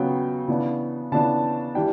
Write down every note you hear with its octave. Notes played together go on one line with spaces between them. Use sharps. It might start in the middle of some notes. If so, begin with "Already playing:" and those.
Already playing: C#3 F#3 B3 G5
C#3 E3 B3 D4
C#3 E3 B3 D4 A5
E3 G3 D4 G5